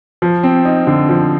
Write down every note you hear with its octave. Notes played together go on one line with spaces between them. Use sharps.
F3
C4
D#4
D3
F3